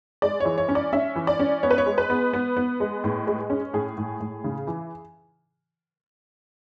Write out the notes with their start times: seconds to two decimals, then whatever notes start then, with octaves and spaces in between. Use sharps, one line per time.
0.22 G#3 D5
0.40 E3 C#5
0.58 C#5
0.69 C#4
0.75 D5
0.93 C#4 E5
1.16 E3
1.27 D5
1.39 C#4
1.63 B3 C#5
1.71 B4
1.78 C#5
1.86 G#3
1.98 B4
2.10 B3
2.33 B3
2.57 B3
2.80 G#3
3.04 A2
3.27 G#3
3.50 C#4
3.73 A2 G#4
3.98 A2
4.20 A2
4.44 C#3
4.67 E3